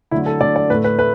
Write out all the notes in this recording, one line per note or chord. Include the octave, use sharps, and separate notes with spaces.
D3 F#3 A3 E4
A4
D3 F#3 A3 D5
D5
A2 A3 B4
B4
A3 B4